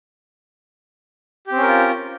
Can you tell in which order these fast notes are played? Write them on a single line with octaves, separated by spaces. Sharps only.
G4 C4 C#4 A#4 F4